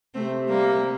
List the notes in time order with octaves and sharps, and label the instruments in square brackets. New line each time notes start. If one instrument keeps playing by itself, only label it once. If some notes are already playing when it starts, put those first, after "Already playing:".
[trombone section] C3 [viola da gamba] A3 C4
[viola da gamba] G3 A#3